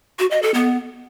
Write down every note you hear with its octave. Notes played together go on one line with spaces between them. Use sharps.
F#4
D#5
A4
B3